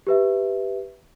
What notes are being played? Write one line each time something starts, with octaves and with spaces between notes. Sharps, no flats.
G4 B4 E5